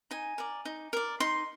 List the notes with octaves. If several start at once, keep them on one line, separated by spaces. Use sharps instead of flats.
D#4 G#5
A#4 D5
D#4
A#4 D5
D#4 C6